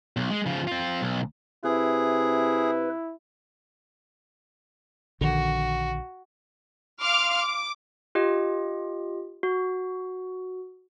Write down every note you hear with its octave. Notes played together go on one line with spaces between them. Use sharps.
B1
G#3
C#3 F3
C4 F4
B1
C3 E4 G#4 B4
A#1 D3 D#3 F#4
F5 C6 D6 F6
D6
F4 G4 D#5
F#4